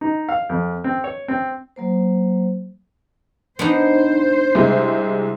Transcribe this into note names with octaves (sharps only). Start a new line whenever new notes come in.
D#4
F5
F2
C4
C#5
C4
F#3 A#3 C5
B3 D4 D#4 C5
C2 G#3